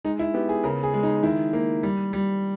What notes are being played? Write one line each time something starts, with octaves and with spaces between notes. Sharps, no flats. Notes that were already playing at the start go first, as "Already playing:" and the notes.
G#3 D#4
E4
B3 G4
G#4
C#3 A#4
G#4
G#3
D#4
D#3 E4
A#3
G3
G3